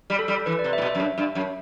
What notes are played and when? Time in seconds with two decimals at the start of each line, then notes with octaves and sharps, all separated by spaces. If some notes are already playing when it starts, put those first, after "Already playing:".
0.10 G3
0.19 A4
0.28 G3
0.46 E3 B4
0.59 D5
0.64 C3
0.73 E5
0.78 A2
0.82 B2
0.86 E5
0.95 F#2
1.00 G2
1.18 G2
1.35 F#2